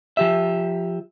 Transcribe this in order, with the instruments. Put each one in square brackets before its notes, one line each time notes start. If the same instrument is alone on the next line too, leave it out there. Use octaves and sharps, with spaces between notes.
[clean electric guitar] F3 G4 E5